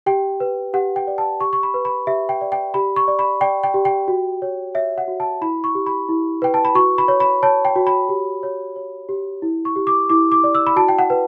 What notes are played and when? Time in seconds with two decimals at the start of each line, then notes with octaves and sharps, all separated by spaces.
0.06 G4 G5
0.40 B4
0.74 G4 F#5
0.96 G5
1.07 D5
1.18 A5
1.40 G4 C#6
1.53 C#6
1.63 B5
1.74 B4
1.85 B5
2.07 G4 E5
2.29 G5
2.41 D5
2.52 G5
2.74 G4 B5
2.96 C#6
3.08 D5
3.19 B5
3.41 D5 G5
3.64 G5
3.74 G4
3.85 G5
4.08 F#4
4.42 C#5
4.75 C#5 E5
4.98 F#5
5.08 F#4
5.20 A5
5.41 E4 B5
5.64 C#6
5.75 G4
5.86 B5
6.09 E4
6.42 B4 G5
6.54 A5
6.65 B5
6.75 F#4 C#6
6.98 B5
7.08 C#5
7.20 B5
7.43 C#5 A5
7.65 G5
7.76 F#4
7.87 B5
8.09 G4
8.43 C#5
8.76 C#5
9.09 G4
9.42 E4
9.65 C#6
9.76 G4
9.87 D6
10.09 E4 D6
10.32 D6
10.44 D5
10.55 E6
10.67 B5
10.76 F#4 A5
10.88 G5
10.99 F#5
11.10 B4